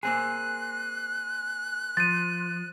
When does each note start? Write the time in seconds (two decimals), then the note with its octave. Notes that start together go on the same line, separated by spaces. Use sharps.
0.03 A#3 C4 G#4 F#6
1.97 F3 A6 D#7